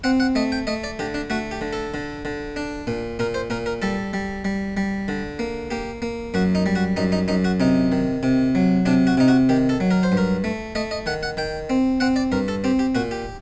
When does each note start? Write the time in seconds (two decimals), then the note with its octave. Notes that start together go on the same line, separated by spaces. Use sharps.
0.04 C4 F#5
0.20 F#5
0.35 A3 D#5
0.52 G5
0.67 A3 D#5
0.84 D5
0.99 D3 G4
1.14 D4
1.30 A3 F#4
1.51 G4
1.61 D3
1.73 A4
1.94 D3
2.25 D3
2.56 D4
2.87 A#2
3.19 A#2 A#4
3.34 C5
3.50 A#2 A#4
3.66 A#4
3.82 G3 A4
4.13 G3
4.45 G3
4.77 G3
5.08 D3
5.39 A#3
5.71 A#3 G4
6.02 A#3
6.34 F#2 F#4
6.55 D#4
6.66 G3
6.75 F#4
6.97 F#2 D#4
7.12 D#4
7.28 F#2 D#4
7.44 F#4
7.60 C3 D#4
7.92 D#3
8.23 C3
8.55 F#3
8.86 C3 D4
9.07 F#4
9.17 C3 D#4
9.28 F#4
9.49 D#3 G4
9.69 A4
9.80 F#3
9.91 A#4
10.03 C5
10.12 G2
10.17 A#4
10.44 A3
10.75 A3 D#5
10.91 D#5
11.06 D#3 F#5
11.23 F#5
11.37 D#3 G5
11.70 C4
12.00 C4 F#5
12.16 D5
12.32 G2 A#4
12.48 A4
12.64 C4 G4
12.79 G4
12.95 A#2 F#4
13.11 G4